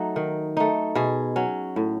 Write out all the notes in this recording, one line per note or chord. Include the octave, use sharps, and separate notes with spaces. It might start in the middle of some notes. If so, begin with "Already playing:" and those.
Already playing: F#3 A3 D#4
D#3
A3 D#4
B2 G#4
F#3 C#4
A2